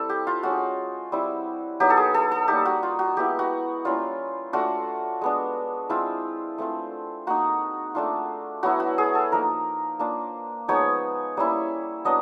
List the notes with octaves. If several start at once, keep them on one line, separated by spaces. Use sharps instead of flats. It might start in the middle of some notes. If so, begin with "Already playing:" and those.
Already playing: G3 C4 E4 A4
G4
F4
G#3 C#4 F4 F#4
G3 C4 E4
F#3 B3 D#4 G4
A4
G#4
A4
A4
G3 A#3 D#4 G4
F#4
F4
F#4
G#3 B3 E4 G4
F#4
G3 A#3 C#4 E4 F4
A3 D4 F4 F#4
G#3 B3 D4
G#3 C4 E4 F4
A3 C4 F4
A#3 D#4 F#4
A3 D4 F4
F#3 B3 E4 F#4
F#4
G#4
A4
F3 A#3 D#4 A#4
A#3 D4 F4
F3 G#3 B3 D#4 C#5
G3 A#3 C#4 E4
F#3 B3 D4 D#5